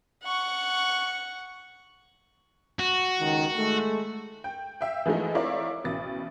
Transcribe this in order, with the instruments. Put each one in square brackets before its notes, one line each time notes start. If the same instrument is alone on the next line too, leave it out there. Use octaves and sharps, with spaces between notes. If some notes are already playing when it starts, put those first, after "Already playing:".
[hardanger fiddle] F#5 C#6
[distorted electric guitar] F#4
[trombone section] C#2 D#3
G#3 A3
[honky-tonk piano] G5
E5 F5 G5
E3 F3 G#3 A3 D#4
C4 E4 A#4 C#5 D5 F5
A1 B2 A6